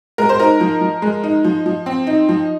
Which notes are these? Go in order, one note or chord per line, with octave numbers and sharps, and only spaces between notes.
G#3 A#4
C5
D#4 A#4
F3
F3
G#3
D#4
F3
F3
C4
D#4
F3